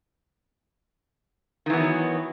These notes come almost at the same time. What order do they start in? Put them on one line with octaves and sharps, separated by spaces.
D#3 E3 B3 F#3